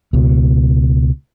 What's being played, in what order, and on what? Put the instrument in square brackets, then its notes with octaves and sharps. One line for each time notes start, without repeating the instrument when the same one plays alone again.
[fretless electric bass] C#2 B2